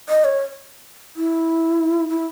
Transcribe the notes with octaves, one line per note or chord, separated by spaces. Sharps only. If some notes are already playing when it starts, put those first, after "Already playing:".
D#5
C#5
E4
E4